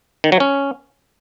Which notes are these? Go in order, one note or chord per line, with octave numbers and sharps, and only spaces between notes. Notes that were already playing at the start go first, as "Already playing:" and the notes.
D#3
F#3
C#4